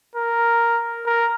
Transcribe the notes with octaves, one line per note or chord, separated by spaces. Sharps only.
A#4
A#4